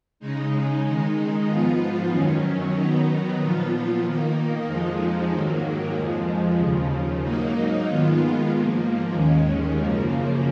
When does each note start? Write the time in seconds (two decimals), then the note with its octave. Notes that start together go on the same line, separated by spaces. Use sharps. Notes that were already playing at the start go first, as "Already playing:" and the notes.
0.20 C#3 G#3 D#4
0.83 D#3 G#3 D#4
1.47 G#2 F3 B3 F4
2.11 F#2 D#3 F#3 C#4
2.75 D#3 F#3 B3 D#4
3.39 A#2 F3 B3 F4
4.03 D#3 A#3 D#4
4.66 F2 F3 G#3 D#4
5.30 G#2 D#3 F#3 A#3
5.94 F2 F3 G#3
6.58 D#2 C#3 F3
7.23 G#2 F#3 A#3 D#4
7.86 D#3 G#3 B3 F4
8.49 G#2 F3 A#3
9.13 D#2 D#3 G#3 C#4
9.77 F#2 C#3 F3 A#3